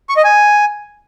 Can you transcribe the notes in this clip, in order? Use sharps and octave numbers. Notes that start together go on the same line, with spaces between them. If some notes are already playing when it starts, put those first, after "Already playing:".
C#6
D#5
G#5